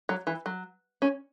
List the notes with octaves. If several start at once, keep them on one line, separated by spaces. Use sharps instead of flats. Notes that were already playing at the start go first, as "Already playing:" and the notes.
F#3
E3
F#3
C#4